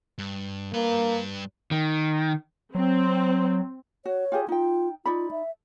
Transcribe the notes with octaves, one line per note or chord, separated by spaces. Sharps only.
G2
G2 A#3 B4
D#3
F#3 C4
F#4 C#5
F4 G4 G#4
D#4 F4 G5
D#4 F4 D5 B5
E5